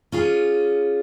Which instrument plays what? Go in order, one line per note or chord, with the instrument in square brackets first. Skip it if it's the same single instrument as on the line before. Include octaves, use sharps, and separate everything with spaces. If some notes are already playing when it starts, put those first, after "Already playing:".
[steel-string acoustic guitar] C#4 F4 G#4